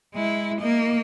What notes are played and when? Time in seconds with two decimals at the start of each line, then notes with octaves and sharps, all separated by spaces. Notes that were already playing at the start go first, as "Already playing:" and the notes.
0.14 G#3 E4
0.61 A#3 D#5